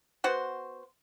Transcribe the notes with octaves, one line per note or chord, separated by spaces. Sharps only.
B3 F#4 C5